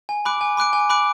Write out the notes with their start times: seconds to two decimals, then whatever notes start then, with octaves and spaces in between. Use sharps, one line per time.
0.09 G#5
0.25 B5 D6 F#6 D7
0.41 G#5
0.57 B5 D6 F#6 D7
0.73 G#5
0.90 B5 D6 F#6 D7